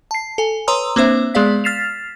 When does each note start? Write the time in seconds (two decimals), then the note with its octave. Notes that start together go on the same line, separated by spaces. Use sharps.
0.11 A5 C7
0.38 A4 G#5
0.68 B4 C#5 A#5 C6 D#6 E6
0.96 A#3 C4 D4 C5 E5
1.34 G#3 B3 G#4 D5 F5 B6
1.64 F6 A6 B6 C7 E7 F7